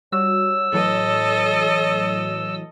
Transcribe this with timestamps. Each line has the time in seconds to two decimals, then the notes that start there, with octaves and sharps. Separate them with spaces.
0.12 G3 F#4 C#5 E6
0.73 A2 E3 F#3 A4 D#5